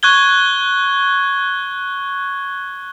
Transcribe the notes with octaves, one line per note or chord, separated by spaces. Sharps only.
C#6 F#6 G#6 G7